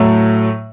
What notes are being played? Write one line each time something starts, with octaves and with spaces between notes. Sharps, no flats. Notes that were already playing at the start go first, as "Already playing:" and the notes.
Already playing: A2 F#3 A3